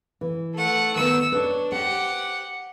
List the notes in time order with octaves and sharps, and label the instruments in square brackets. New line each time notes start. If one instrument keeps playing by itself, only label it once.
[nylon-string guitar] E3
[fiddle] A3 F#5
[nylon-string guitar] D#3 B3 [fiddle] E6
[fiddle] D4 [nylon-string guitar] B4 C#5
[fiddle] G4 F#5 [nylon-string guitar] C5